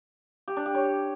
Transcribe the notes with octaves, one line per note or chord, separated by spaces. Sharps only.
G4
D4
G4
C#5